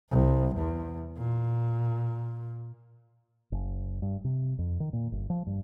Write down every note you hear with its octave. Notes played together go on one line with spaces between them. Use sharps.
C2
E2
A#2
F#1
G2
C3
F2
D#3
A#2
G1
F3
G2